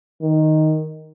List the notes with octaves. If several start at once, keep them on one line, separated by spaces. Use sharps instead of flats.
D#3